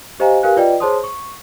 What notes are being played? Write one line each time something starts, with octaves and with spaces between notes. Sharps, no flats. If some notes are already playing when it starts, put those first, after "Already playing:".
G4 C5 D#5 F5 G#5 A#5
G4 A#4 B4 F5 G#5 F#6
F4 B4 D5 D#5 G5
G#4 C5 C#5 A5 C6 D#6
C#6